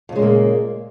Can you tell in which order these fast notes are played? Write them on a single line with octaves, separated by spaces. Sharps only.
F2 C#3 G#3 A#2 A#3